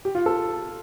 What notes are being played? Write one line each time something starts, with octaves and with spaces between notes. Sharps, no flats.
G4
F4
A4